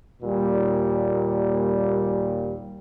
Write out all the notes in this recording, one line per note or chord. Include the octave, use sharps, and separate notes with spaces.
D#2 A#2 G3